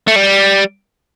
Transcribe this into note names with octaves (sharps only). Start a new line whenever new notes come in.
A3
G3